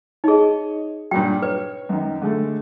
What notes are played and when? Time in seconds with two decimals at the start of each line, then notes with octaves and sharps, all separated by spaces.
0.24 D#4 G#4 C#5 D#5
1.11 G2 A#2 F#3 G5
1.42 B4 C#5
1.89 F#2 D#3
2.22 D3 G#3 A3